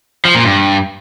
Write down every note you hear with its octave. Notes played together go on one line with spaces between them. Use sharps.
F3
A#2
G2